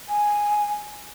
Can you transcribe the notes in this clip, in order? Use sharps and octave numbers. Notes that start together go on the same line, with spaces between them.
G#5